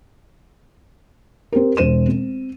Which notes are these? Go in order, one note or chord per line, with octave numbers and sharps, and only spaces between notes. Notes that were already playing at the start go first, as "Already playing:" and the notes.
C4 G4 A#4
E1 C5 D#7 E7
C4